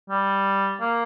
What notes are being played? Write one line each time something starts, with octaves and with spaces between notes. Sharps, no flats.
G3
A#3